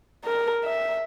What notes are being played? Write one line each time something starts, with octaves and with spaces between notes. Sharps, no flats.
A#4
E5